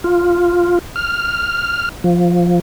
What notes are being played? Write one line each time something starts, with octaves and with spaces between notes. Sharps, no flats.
F4
F6
F3